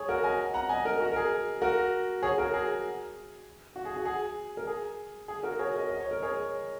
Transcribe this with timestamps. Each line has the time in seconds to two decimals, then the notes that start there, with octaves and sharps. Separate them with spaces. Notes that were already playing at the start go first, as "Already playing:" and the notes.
Already playing: G#4 C#5
0.09 F#4 A#4
0.24 D#5 G#5
0.54 F#5 A#5
0.69 D#5 G#5
0.85 A#4 D#5
1.00 F#4
1.12 A#4
1.16 G#4
1.62 F#4 A#4
2.23 G#4 C#5
2.38 F#4 A#4
2.54 G#4
3.76 F#4
3.85 G#4
3.96 F#4
4.05 G#4
4.57 A#4
4.67 G#4
5.28 G#4
5.43 F#4 A#4
5.59 G#4 C#5
5.74 A#4 D#5
5.89 D#5
6.00 C#5
6.11 A#4
6.23 G#4 C#5